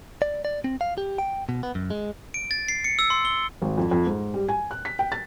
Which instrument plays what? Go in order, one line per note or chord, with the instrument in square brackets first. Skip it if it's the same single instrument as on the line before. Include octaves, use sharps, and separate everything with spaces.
[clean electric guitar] D5
D5
C4
F5
G4
G5
B2
B3
F#2
G#3
[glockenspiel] D7
A6
C7
C#7
E6
C6
G7
[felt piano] G#1
F2
F2
G#2
G3
G#5
F#6
B6
G5
A6